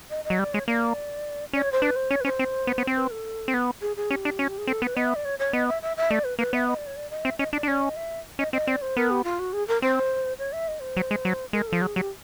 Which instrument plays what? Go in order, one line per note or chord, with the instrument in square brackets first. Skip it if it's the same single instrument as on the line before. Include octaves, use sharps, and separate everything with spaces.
[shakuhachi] D#5
D#5
[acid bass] F#3
[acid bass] G3 [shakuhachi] D5
[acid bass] G#3 [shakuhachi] C#5
[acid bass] A#3 [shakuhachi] D5
[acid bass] C#4 [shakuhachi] D5
[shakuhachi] C#5
C5
[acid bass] D4 [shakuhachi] B4
[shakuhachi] C5
[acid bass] C#4 [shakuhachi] C#5
[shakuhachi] B4
[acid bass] C#4 [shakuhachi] C5
[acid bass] C4
B3
B3
C4
[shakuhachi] B4
A4
[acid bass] C4
B3
[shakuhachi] G#4
G#4
[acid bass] C#4 [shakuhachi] G4
[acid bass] D4
[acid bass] C#4 [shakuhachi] F#4
[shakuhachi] G4
G#4
[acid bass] C4 [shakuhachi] A4
[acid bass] B3 [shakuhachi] B4
[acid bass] B3 [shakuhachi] D#5
[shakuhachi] E5
D5
C#5
C#5
[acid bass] B3 [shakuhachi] D#5
[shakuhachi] E5
E5
E5
[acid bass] A3 [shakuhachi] D5
[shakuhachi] B4
[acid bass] A#3 [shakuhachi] B4
[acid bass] B3 [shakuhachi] E5
[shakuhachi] D#5
D5
C#5
D5
D#5
[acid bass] C4 [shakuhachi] E5
[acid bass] C#4 [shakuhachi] D#5
[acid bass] D4 [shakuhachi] D5
[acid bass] D4
[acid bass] C#4 [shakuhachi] D5
[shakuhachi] D#5
E5
[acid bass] C#4 [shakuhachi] D#5
[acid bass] C4 [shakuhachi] D#5
[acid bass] C4 [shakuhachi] D5
[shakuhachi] C5
[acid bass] B3 [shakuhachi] A#4
[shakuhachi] G4
F4
F#4
G#4
A#4
[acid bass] C4 [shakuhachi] C5
[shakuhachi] C#5
E5
D#5
C5
[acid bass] F#3
G#3
F#3
[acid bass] G#3 [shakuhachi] A#4
[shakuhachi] A4
[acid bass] F3
[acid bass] F#3 [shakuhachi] G#4
[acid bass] F#3 [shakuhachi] G4